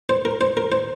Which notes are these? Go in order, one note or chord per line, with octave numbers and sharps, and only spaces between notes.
C5
A#4
C5
A#4
C5